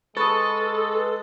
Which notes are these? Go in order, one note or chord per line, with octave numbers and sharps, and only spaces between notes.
G#3 A4 B4 C#6 D#6 A6